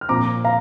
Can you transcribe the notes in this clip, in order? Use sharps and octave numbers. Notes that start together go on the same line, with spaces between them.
F6
A#2 F3 C4 A#5 D6
F5 A#5